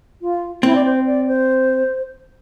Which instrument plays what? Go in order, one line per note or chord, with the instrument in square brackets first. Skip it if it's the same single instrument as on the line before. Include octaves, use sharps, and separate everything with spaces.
[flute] F4
[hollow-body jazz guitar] C4 [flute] E4
[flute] D5
C5
D5
C5